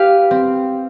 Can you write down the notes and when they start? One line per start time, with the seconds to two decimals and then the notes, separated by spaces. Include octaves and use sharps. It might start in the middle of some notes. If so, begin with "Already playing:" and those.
Already playing: G4 B4 F5
0.31 C4